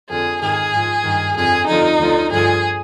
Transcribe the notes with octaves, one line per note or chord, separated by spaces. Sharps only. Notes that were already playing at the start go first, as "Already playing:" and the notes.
F2 D3 F3 G#4
G#2 D#3 G#4
G#2 F3
G2 D#3
F2 D3 F3 G#4
F2 D3 F3 D#4
D2 D3 F3
G2 D3 F3 G#4